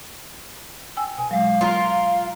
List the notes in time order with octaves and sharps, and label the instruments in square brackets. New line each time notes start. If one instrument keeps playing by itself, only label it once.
[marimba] G5 G#5 E6
[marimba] B2 [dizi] G#5
[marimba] F#3 G#3 [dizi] F5
[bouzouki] F4 A#4